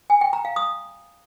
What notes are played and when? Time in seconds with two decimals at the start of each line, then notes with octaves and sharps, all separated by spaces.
0.10 G#5
0.21 G5
0.33 A#5
0.45 F5
0.56 D#6